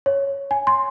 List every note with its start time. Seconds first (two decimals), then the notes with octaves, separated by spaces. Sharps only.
0.06 C#5
0.51 G#5
0.67 C6